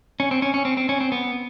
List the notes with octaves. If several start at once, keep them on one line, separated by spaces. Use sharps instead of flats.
C#4
C4
C#4
C#4
C4
C4
C#4
C4
B3